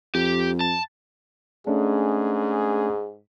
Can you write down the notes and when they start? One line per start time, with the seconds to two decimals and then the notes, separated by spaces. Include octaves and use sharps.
0.15 F2 G4
0.60 A5
1.67 G#2 A3 C#4 D4 G#4